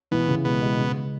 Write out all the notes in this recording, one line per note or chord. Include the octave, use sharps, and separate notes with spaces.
B2 E3 B3
C#3
B2 G#3 B3
G#3
C#3